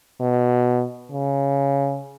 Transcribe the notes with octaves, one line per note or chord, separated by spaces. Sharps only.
B2
C#3